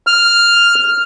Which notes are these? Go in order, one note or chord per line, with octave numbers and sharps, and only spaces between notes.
F6